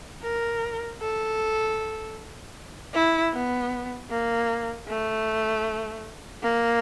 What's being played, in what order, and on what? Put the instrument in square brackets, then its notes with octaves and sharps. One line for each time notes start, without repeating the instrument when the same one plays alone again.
[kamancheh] A#4
A4
E4
B3
A#3
A3
A#3